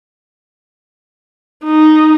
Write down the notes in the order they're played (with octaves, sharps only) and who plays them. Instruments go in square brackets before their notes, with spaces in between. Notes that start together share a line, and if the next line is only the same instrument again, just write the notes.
[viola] D#4